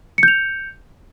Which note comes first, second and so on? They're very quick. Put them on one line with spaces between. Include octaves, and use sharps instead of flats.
C#7 G6 F7